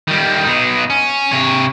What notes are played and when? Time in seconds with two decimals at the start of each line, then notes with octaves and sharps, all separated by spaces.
0.08 D#3 G3
0.45 B2 D#4
0.90 C#4
1.32 C3 C#5